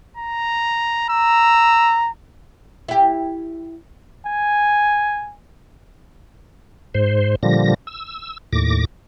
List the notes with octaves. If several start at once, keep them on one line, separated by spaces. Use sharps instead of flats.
A#5
A#5 E6
E4 G4
G#5
G#2 C5
A#2 D3 F3 G3 A#6
E6
D#2 A2 D6 A#6